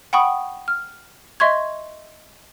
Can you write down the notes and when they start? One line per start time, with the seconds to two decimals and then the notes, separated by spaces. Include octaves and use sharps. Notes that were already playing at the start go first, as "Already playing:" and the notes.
0.13 F#5 G5 B5 C#6 D#6
0.68 F6
1.40 D#5 E5 C6 C#6 G#6